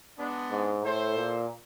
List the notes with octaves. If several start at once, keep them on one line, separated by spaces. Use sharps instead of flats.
G#3 B3 D4
G#2
A2 E4 A4 C5
A#2